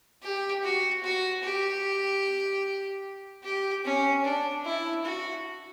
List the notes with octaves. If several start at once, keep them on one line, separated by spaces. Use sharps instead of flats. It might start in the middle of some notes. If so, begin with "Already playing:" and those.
G4
F#4
F#4
G4
G4
C#4
D4
E4
F#4